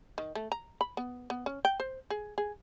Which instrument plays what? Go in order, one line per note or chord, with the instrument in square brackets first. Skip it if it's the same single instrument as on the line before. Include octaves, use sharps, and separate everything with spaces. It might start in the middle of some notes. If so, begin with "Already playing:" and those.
[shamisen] D#3
A3
A#5
B5
B3
B3
C#4
G5
C5
G#4
G#4